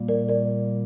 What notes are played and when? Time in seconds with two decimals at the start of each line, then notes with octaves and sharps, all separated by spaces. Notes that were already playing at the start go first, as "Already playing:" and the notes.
Already playing: A#2 G3 A#3
0.09 A#4 D5
0.29 A#4 D5